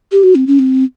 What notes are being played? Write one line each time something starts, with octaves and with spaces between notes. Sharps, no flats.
G4
F#4
C4
C#4
C4